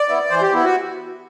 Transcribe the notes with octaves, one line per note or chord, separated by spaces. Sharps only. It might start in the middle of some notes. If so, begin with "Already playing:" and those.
Already playing: D5
B3 E4
E3 C5
G4
B3 E4
F#4